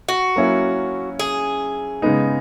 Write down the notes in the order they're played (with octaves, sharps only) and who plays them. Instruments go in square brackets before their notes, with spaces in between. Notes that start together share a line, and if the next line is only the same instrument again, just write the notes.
[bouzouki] F#4
[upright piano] F#3 A#3 C#4 E4
[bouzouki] G#4
[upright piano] C#3 G#3 B3 D#4